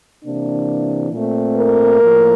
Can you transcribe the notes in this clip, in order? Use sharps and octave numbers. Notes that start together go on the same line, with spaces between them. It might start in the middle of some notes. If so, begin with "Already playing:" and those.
C3 E3 A#3 D4
A#2 A3 C4
A#4
A2 F3 A#3